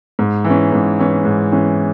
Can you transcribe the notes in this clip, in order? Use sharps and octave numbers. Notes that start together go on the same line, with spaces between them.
G#2
E3
C#4
G#2
E3 C#4
G#2
E3 C#4